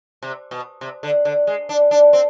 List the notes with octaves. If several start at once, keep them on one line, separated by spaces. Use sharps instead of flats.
C3
B2
C3
D3
D3
G#3
D4
D4
C4